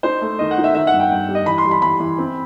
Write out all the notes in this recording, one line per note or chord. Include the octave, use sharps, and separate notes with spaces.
D#4 C5
A3
D#3 D#5
F#5
D#4
E5
D#3 E5
F#5
G2
G5
G2 G5
G3
D#5
E3 B5
C6
G3
B5
E3 B5
E3
C4